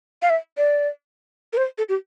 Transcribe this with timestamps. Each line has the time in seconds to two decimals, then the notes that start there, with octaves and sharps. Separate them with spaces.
0.22 F5
0.30 E5
0.57 D5
1.53 A#4
1.57 C5
1.78 A4
1.89 G4